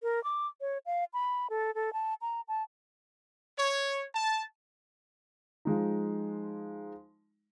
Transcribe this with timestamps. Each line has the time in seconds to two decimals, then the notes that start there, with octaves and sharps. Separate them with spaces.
0.03 A#4
0.24 D6
0.61 C#5
0.86 F5
1.13 B5
1.50 A4
1.75 A4
1.93 A5
2.21 A#5
2.48 A5
3.59 C#5
4.15 A5
5.65 F3 G#3 D#4